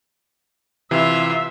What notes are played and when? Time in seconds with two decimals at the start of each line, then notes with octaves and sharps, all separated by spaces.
0.91 C3 E3 E4 F4 E5